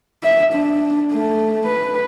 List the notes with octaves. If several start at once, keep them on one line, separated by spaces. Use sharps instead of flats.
E5
D4
A3
B4